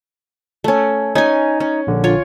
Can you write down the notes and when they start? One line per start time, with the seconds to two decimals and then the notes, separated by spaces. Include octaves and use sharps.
0.64 A3 C#4
1.15 C#4 D#4 G#5
1.60 C#4
1.87 A#1 D3
2.04 F4 C#5